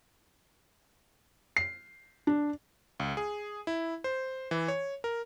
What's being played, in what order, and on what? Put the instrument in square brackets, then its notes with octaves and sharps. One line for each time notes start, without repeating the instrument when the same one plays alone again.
[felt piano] C7
D4
[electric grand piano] C#2
G#4
E4
C5
E3
C#5
A#4